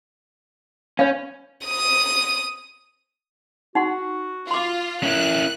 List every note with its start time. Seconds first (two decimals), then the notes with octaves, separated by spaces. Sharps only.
0.99 C#4 C#5 F5
1.66 D#6 D#7
3.75 D#4 F#4 F#5 C6
4.51 F4 C6 D6
5.03 C#4 E4 A#4 F#6